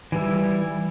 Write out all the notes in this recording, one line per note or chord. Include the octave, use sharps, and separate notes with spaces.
E3 G3 E4